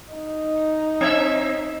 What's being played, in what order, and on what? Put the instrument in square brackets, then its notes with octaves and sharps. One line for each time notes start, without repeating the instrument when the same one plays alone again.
[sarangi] D#4
[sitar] C4 E5